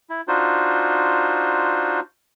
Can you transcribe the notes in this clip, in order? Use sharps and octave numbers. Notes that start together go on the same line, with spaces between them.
E4
D4 D#4 F4 F#4 C5